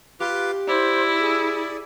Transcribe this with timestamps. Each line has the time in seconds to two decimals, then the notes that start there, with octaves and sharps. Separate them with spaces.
0.20 F4 G4 B4 D6
0.68 E4 C5 D5
1.20 G#4